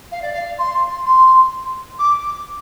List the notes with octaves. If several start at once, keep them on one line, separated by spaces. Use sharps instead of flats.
F5
D5
F5
C6
C6
D6